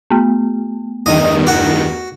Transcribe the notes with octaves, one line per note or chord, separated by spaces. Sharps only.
A3 B3
E2 G2 D#3 D#5
F#4